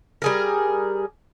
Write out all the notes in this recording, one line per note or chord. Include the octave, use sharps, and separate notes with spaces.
G3 G#4 A#4